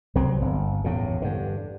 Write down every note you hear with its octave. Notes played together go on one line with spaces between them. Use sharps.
C2 F#3 G3 C4
G1
E2 A2 C#3
G2 D3